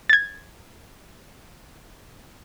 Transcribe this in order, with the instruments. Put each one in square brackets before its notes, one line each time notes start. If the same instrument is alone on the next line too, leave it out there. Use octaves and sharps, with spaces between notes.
[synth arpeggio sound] G#6 A6